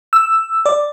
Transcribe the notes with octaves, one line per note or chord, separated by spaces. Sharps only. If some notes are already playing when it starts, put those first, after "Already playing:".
E6
D5